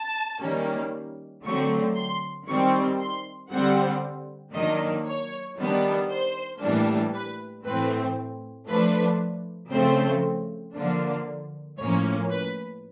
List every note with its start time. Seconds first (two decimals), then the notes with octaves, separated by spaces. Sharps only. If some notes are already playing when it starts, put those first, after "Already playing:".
Already playing: A5
0.41 D#3 G3 A#3 C#4
1.45 D3 F#3 A3 C4 C#6
1.96 C6
2.48 D#3 G3 C4 C#6
3.00 C6
3.51 D3 G3 C4 F#5
4.54 D#3 F#3 A#3 D4 D#5
5.06 C#5
5.58 D#3 G3 B3 D4
6.10 C5
6.61 A2 E3 G3 A#3 D4
7.13 B4
7.65 A2 E3 A3 C4 B4
8.68 F3 A3 D4 B4
9.71 C#3 F3 A3 C4 C5
10.74 D3 F3 A#3 D4
11.78 A2 F3 A#3 C#4 C#5
12.30 B4